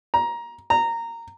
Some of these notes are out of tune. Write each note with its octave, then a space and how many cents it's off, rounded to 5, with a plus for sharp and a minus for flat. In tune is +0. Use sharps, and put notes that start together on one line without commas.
A#5 +15
A#5 -15